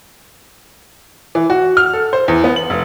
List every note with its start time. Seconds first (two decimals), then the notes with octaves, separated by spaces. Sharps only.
1.35 E3
1.50 F#4
1.77 F6
1.93 A4
2.13 C5
2.28 E2
2.44 B3
2.56 F#7
2.70 F1